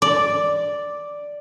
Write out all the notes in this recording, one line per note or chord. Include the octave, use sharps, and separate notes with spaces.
D5